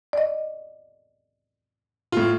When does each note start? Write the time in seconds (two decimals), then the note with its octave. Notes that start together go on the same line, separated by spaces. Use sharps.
0.13 D5 D#5
2.12 A2 F4